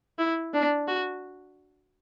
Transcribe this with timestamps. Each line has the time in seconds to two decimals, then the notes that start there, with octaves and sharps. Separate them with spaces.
0.18 E4
0.53 D4
0.87 F#4